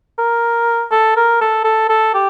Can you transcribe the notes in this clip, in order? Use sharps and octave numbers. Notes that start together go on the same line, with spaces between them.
A#4
A4
A#4
A4
A4
A4
G4